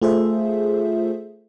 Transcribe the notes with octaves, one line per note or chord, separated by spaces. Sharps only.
A3 F4 G#4 A4 C5 E5